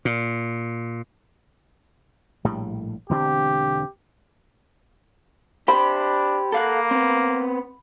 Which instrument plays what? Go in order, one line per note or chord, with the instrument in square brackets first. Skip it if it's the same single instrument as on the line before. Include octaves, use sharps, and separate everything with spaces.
[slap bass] A#2
A#1 A2 G3
[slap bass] E1 D3 C4 [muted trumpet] G4
[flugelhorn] D4 [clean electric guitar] G4 C5 [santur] B5
[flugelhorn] A#3 [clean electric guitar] A4 F5 F#5
[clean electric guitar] B3 C4